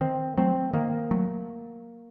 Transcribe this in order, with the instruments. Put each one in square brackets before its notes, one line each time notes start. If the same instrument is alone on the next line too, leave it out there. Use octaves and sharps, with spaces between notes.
[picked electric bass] D#3 [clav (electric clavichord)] C4
[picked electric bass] F#3 A3 [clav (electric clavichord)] C4
[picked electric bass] D#3 [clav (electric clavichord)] A#3
[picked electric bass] F#3 A3